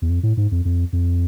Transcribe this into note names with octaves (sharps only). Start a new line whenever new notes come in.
E2
F2
A2
G#2
F2
F2
F2